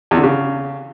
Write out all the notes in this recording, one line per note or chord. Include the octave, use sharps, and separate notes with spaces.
E2
D3
C#3